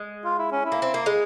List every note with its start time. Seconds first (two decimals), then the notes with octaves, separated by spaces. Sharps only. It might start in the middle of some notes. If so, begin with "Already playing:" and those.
Already playing: G#3
0.25 F4
0.38 E4
0.52 C#4
0.65 E4
0.72 A#3
0.82 C4
0.94 A#3
1.06 G#3